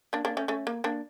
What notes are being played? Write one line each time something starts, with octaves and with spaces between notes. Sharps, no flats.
A#3 D4
A#3 D4
A3 C#4
A3 C#4
A#3
A#3 D4